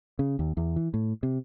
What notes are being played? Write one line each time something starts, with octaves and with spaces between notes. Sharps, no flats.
C#3
D#2
E2
E3
A2
C3